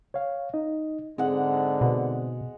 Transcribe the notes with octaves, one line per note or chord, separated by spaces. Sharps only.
C#5 F5
D#4 D#5
G#2 D3 G#3 C4 F#5
B2